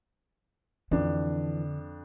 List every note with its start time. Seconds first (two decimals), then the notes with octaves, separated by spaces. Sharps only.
0.91 F2 D3 E3 D4